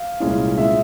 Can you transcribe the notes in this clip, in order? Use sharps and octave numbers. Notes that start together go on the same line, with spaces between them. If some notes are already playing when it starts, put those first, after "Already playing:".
Already playing: F5
C2 A#2 G#3 C#4
A#2 G#3 C#4 E5